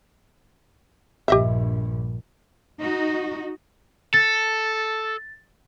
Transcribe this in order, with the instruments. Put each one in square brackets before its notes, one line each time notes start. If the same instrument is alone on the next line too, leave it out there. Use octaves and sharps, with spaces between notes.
[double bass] A#1 G2 [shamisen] G4 D#5 E5
[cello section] D#4 F#4
[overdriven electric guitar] A4 [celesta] A6